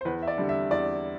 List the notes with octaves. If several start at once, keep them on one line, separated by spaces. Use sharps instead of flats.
C5
E2 B4
E5
D5
D3 G3
E5
E2 D5